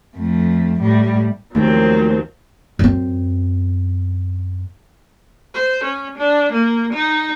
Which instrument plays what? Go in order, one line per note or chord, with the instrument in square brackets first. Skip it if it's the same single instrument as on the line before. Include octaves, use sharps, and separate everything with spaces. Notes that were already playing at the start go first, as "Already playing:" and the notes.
[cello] F2 A3
A2 G3
[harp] D#2 [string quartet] F3 F#3 C4 [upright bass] A3
[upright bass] F#2 C4
[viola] C5
C#4
D4
A#3
D#4